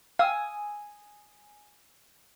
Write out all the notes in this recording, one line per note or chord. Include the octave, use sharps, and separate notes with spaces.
F5 G#5 D#6 E6